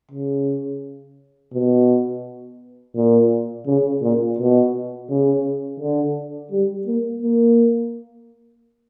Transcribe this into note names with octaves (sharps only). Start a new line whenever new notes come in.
C#3
B2
A#2
C#3
A#2
B2
C#3
D3
G3
A#3
A#3